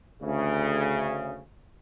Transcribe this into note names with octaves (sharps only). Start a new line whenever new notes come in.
D2 C#3